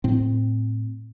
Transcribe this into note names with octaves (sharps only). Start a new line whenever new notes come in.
A2 C4